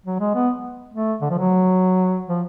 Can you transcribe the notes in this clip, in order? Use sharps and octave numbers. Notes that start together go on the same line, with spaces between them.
F#3
G#3
B3
A3
D3
F3
F#3
F3